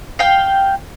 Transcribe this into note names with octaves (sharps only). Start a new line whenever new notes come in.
F5 G5